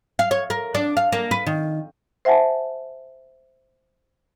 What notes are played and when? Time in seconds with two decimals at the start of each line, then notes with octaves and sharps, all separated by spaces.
0.19 F5
0.31 C#5
0.50 A#4
0.75 D4
0.97 F5
1.12 A#3
1.31 B4
1.47 D#3
2.25 C5 E5 F#5 G#5 A5